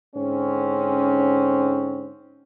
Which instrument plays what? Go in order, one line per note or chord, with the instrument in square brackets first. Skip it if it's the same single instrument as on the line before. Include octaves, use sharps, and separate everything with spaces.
[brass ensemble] G#2 D3 C4 C#4